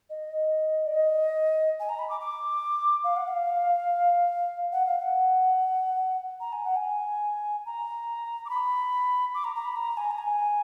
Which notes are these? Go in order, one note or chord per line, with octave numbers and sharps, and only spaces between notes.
D#5
D5
D#5
G#5
A#5
B5
D6
D6
F5
F#5
F5
F#5
F5
F#5
A#5
G#5
F#5
G#5
A#5
D6
B5
D6
A#5
A#5
B5
A#5
G#5
A#5
G#5